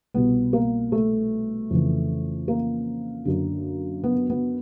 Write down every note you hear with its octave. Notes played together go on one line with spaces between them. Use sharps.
C2 B2 B3
A#3
A3
F2 C#3 E3
A#3
F#2 D3
B3
B3